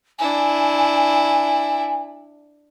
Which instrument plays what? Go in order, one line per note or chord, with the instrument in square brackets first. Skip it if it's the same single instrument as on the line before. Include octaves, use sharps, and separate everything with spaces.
[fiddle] D4 E4 [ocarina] G#5